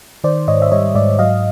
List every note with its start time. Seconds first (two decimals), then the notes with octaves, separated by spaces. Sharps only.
0.24 D#3 C5 D5
0.48 G#2 C#5 D#5
0.62 E5
0.72 G3 C#5 D#5
0.95 G#2 D5 E5
1.19 F#3 D#5 F5